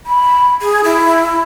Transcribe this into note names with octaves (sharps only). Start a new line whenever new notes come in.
B5
G#4
E4